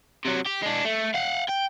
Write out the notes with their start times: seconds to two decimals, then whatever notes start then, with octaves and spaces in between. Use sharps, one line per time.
0.25 C3 F#3
0.46 G4
0.62 G#3 D4
0.85 A3
1.14 F5 F#5
1.49 G5